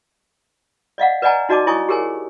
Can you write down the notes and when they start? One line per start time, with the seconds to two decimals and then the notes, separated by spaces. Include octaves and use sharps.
0.98 D5 D#5 F5 F#5
1.22 B4 D5 D#5 F#5 G#5 A#5
1.49 D#4 F#4 D5 D#5 A5 D6
1.67 E4 C#5 D#5 G#5 C#6 D#6
1.89 G4 G#4 A#4 C#5 G#5